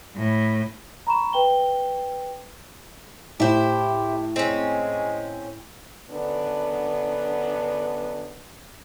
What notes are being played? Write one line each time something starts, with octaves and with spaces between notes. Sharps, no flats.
A2
A#5 B5 C#6 E7
B4 G5 G7
A2 E4 G4 C5
G#3 C4 C#4
F#2 D3 B3 D4